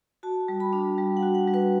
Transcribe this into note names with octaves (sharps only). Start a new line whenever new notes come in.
F#4 A5
G3
B5
D4
G3
F#5
F#4
F#5
G3
B4